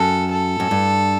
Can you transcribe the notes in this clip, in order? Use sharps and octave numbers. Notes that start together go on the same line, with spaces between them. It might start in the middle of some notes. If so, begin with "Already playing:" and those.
Already playing: F#2 A4
A4
F#2
G2